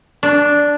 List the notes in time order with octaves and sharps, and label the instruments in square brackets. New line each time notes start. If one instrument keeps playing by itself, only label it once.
[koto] D4